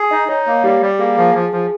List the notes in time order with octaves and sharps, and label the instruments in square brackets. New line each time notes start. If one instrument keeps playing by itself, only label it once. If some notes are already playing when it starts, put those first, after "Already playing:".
Already playing: [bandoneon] G#4
[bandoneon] D#4 [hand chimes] D#5
[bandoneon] D#4 [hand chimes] C#5
[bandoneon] A#3 [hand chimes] C#5
[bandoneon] G3 [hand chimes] G4
[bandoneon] G3
[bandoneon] A#3 [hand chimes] G#4
[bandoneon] F3 [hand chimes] G#4
[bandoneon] F3
[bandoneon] F3 [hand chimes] G#4